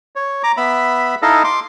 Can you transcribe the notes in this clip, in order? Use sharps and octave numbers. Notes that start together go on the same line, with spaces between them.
C#5
A#5 D6
B3 E5 B5
D#4 E4 A4 D#5 F5
C6 D6